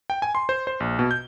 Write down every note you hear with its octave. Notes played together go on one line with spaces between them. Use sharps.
G5
G#5
C6
C5
C5
A#1
B2
G6